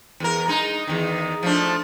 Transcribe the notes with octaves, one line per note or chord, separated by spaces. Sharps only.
E2 A#4
G#3 D#4
E2 D#3
F3 A3 D4